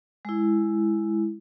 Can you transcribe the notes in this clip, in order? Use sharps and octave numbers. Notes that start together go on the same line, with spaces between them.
G#3 E4